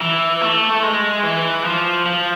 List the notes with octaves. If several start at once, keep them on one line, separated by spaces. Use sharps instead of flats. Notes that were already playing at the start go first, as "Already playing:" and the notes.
E3
A3
G#3
E3
F3
F3